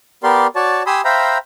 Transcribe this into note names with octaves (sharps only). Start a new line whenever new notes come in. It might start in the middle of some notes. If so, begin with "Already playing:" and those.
B3 G4 A#4 D5 C6
F#4 C#5 D5 A5
G4 G#5 B5 C6 D#6 E6
C5 E5 F5 G5 A#5 B5